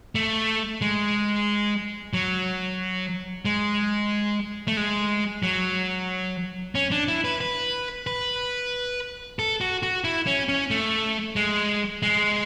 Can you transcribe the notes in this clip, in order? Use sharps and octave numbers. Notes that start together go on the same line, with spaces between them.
A3
G#3
F#3
G#3
A3
G#3
F#3
C#4
D4
E4
B4
B4
B4
A4
F#4
F#4
E4
C#4
C#4
A3
G#3
G#3